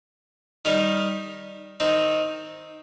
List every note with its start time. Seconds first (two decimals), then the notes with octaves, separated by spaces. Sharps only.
0.65 D#3 G3 D#4 A#4
1.80 D#3 C4 D#4